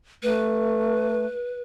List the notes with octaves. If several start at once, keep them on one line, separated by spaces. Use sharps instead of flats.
A3 B4